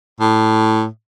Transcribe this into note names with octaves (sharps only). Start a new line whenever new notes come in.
A2